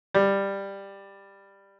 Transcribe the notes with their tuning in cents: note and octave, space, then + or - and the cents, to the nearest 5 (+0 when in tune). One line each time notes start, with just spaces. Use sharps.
G3 +10